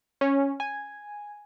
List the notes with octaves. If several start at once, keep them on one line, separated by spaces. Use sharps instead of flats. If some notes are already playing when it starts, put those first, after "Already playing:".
C#4
G#5